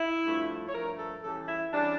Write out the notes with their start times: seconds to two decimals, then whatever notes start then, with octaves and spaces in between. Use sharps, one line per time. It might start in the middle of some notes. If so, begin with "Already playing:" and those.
Already playing: E4
0.25 G2 F3 A3
0.68 C#5
0.74 G2 F3 A3 A#4
0.99 A4
1.23 C#3 E3 G3 A4
1.48 E4
1.72 C#3 E3 G3 D4